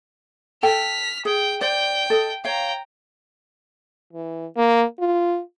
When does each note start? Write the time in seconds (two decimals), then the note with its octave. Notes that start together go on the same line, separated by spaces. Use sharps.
0.63 A4 G5 A5 F6 B6
1.25 G#4 G5
1.61 C5 D5 G5
2.10 A4 D#5
2.45 C#5 F5 G5 A#5
4.13 E3
4.58 A#3
5.00 F4